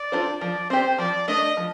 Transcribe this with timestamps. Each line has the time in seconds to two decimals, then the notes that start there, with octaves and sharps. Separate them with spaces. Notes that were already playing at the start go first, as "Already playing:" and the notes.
Already playing: D5
0.12 D4 F4 A4 C5
0.41 F3 D5
0.70 C4 G4 C5
0.98 F3 D5
1.28 A3 D4 D#5
1.57 F3